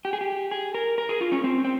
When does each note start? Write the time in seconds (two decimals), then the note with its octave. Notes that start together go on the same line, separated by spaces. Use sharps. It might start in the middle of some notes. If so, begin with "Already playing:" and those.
0.05 G4
0.13 G#4
0.21 G4
0.51 G#4
0.74 A#4
0.98 A#4
1.09 G#4
1.21 F4
1.32 C#4
1.44 C4
1.64 C4